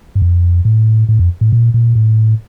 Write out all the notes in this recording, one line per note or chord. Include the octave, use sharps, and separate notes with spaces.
G2
F2
A2
A2
F2
A2
A#2
A#2
A2